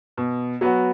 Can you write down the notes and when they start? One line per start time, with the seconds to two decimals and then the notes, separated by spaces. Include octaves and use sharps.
0.17 B2
0.61 F#3 B3 F#4